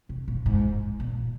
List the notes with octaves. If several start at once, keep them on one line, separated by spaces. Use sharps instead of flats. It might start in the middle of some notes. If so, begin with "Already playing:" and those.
C3
A#2
G#2
A#2